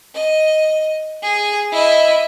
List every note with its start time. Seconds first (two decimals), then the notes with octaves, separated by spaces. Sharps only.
0.15 D#5
1.22 G#4
1.72 E4 D#5